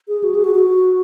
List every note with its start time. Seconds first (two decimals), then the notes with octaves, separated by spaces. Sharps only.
0.08 G#4
0.24 F#4
0.35 G#4
0.44 F#4
0.55 F#4